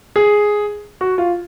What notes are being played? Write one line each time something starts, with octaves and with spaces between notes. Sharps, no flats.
G#4
F#4
F4